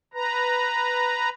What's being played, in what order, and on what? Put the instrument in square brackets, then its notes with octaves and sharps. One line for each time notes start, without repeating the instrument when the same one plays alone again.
[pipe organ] B4 A#5